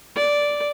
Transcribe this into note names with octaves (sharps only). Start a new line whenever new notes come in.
D5